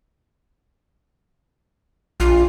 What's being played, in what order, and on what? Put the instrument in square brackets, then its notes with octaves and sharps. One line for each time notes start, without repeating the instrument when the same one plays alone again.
[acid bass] A#1 [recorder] F4